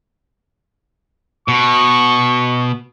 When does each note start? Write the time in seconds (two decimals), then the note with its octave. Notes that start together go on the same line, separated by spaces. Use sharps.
1.48 B2 C#6